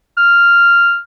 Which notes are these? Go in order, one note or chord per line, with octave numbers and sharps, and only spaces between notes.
F6